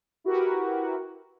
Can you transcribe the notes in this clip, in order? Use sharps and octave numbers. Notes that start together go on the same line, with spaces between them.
E4 F#4 G4 A#4 B4